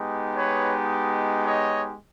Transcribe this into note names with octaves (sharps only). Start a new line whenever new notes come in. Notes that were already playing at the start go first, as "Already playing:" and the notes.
Already playing: G#3 B3 D#4 G4
B4 C#5
C#5 D#5